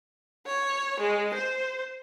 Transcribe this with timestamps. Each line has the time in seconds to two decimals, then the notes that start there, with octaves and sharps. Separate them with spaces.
0.46 C#5
1.00 G#3
1.34 C5